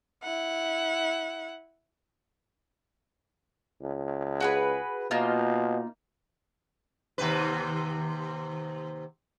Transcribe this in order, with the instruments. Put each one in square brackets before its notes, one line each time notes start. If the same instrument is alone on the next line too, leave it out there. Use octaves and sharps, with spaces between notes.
[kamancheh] E4 F#5
[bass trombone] C#2
[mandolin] F#4 G#4 B4
[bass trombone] B2 [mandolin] A#3 D#4 F4
[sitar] D#2 C3 B4